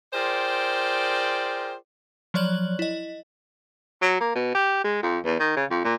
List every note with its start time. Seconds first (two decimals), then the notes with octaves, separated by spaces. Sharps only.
0.14 F4 G#4 A#4 C5 D5 G5
2.34 F3 F#3 C#5 D5 F#6 F#7
2.79 E4 D#5
4.02 F#3
4.20 A#3
4.35 B2
4.55 G4
4.84 G#3
5.03 F2
5.24 E2
5.40 D#3
5.56 C#3
5.70 F2
5.85 A#2